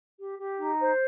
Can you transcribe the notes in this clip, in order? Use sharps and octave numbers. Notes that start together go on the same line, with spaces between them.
G4
G4
D#4
C5